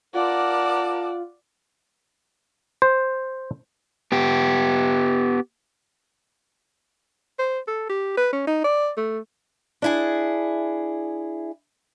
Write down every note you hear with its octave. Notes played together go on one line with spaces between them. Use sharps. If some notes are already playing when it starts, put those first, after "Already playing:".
F4 A#4 D5 F#5 A5 D6
C5
B3 G4
C5
A4
G4
B4
C#4
D#4
D5
A3
D4 E4 G#4